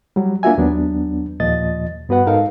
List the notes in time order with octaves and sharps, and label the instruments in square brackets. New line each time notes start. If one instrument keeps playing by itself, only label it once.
[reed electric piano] F#3 G3
A#3 D4 F4 F#4 E5 G#5
D#2 F#3 B3 D4
D#2 A#2 F3 D#5 A6
G2 B3 F#4 B4 F#5
G#2 D#4 A4 A#4 F5